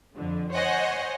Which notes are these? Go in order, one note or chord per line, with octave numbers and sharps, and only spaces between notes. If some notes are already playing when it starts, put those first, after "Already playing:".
F2 D3
C5 C#5 D#5 F#5 G#5